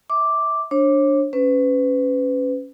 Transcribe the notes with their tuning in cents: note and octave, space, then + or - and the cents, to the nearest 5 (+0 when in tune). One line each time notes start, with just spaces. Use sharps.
E5 -25 D6 +0
D4 +0 C#5 -40
C#4 +0 B4 +30